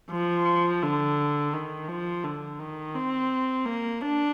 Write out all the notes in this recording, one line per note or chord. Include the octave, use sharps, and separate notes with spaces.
F3
D3
D#3
F3
D3
D#3
C4
A#3
D4